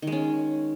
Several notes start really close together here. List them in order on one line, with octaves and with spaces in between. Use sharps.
D#3 G#3 C#4